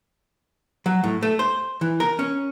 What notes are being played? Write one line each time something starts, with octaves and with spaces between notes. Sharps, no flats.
F#3
A2
A3
C5
E3
A#4
C#4